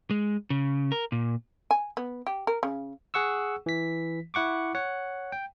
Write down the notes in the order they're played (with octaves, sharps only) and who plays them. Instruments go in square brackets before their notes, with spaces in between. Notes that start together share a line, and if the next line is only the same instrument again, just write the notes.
[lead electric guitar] G#3
C#3
A#4
A#2
[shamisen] G#5
B3
G4
A#4
C#3
[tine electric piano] G#4 F#5 C#6 E6
E3 B6
E4 F#5 C#6 D6
C#5 F#5
G5